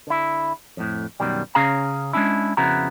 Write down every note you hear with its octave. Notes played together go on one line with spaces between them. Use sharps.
D3 E4
F2 A2
F#2 B2 D#3 G3
C#3 C#4 G#4 F5 A#5
G#3 C#4 D4 E4
F2 C#3 B3 E4 F#4 A#5